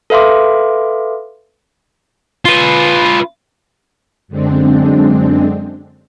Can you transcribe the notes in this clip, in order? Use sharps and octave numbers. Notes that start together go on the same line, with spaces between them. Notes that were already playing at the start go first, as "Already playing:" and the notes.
A4 B4 E5 F5 C6 D6
F4 B4
F#2 D3 G#3 C4 D4